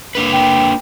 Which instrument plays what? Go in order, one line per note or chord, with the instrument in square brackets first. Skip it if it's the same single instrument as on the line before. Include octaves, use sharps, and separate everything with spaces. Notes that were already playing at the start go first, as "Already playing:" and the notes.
[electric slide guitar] A#3 D4 B4
[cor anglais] G5